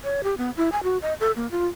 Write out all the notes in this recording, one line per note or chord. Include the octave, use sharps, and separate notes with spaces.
C#5
G4
B3
E4
G#5
F#4
D#5
A4
A#3
F4